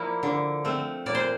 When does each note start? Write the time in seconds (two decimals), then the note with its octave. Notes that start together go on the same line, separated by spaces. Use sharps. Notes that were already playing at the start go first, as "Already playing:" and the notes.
Already playing: F3 A#3 E4 D5
0.23 D3
0.64 F3 A3 C4
1.06 A#2 D5
1.15 C5